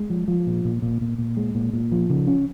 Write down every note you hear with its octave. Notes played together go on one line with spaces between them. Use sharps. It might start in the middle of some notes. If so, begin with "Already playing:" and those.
Already playing: G#3
F3
F3
A#2
A#2
A#2
A#2
A#2
G#3
A#2
A#2
F3
C#3
C#4